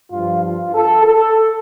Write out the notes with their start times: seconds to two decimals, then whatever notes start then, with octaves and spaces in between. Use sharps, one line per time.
0.12 G2 F3 F4
0.43 F4
0.74 A4
1.06 A4